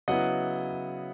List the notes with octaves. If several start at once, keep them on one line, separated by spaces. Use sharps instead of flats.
C#3 F#3 B3 E4 D#5 F#5